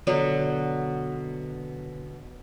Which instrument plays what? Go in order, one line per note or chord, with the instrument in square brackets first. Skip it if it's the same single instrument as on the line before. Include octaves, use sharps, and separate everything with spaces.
[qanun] B2 D3 F#3 B3